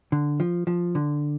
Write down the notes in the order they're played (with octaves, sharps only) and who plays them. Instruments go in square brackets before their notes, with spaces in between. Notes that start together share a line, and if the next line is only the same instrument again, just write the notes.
[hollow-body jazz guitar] D3
F3
F3
D3